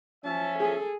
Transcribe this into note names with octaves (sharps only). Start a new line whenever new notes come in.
F3 C#4 E5 A5
G#4 A4